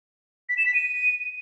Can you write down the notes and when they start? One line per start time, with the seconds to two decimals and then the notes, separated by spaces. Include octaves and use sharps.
0.49 B6
0.58 E7
0.66 B6
0.74 D#7